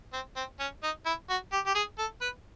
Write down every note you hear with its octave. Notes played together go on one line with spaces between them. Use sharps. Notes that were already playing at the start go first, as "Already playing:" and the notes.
C4
C4
C#4
D#4
E4
F#4
G4
G4
G#4
A4
B4